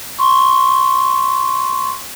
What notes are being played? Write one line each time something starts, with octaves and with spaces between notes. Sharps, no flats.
C6 C#6